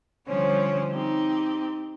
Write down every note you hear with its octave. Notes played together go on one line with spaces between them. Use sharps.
D3 F3 G3 C#4 C5 C#5
C4 D#4 G4